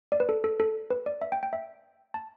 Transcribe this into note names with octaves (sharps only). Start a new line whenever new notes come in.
D5
B4
A4
A4
A4
B4
D5
E5
G5
G5
E5
A5